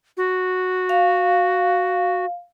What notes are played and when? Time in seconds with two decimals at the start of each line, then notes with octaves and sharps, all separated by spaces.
0.17 F#4
0.89 F5